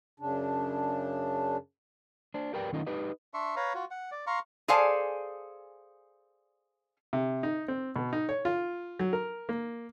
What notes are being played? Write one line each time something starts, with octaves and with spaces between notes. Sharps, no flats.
F#2 C#3 D4
D4 C5
G4 A#4 B4 D5 G5
D#3 A3 C#4 D#4 F4 D#5
D#4 G4 B4 D#5
D4 E5 C6 C#6
B4 C#5 F5 A#5
F4 F#4
F#5
D5
F5 A#5 C6 C#6
G#4 A4 C5 D5 F5 G#5
C3
D#4
C4
B2
D#4
C#5
F4
F#3
A#4
A#3